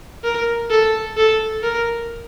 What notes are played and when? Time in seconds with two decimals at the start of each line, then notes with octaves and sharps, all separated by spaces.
0.24 A#4
0.71 A4
1.17 A4
1.63 A#4